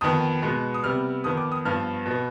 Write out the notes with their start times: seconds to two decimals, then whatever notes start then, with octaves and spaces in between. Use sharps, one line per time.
0.01 F2 D#3 B3 D#6
0.42 B2 G#3 B3
0.74 D#6
0.84 C3 G3 B3 F6
1.24 F2 D#3 B3 D#6
1.37 D6
1.52 D#6
1.65 G2 F3 B3 F6
2.06 B2 B3